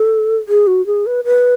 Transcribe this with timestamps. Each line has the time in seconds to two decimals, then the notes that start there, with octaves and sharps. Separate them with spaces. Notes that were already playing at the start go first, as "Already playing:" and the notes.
Already playing: A4
0.49 G#4
0.67 F#4
0.86 G#4
1.06 B4
1.25 B4